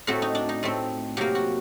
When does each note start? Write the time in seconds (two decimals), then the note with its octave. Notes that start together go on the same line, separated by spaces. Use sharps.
0.07 A2 A3 C4 F#4
0.22 D#4
0.35 D4
0.49 D#4
0.63 A2 A3 C4
1.17 C3 F#3 A#3 G4
1.35 F#4